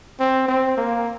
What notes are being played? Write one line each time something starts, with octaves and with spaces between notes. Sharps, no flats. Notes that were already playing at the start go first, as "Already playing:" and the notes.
C4
C4
A#3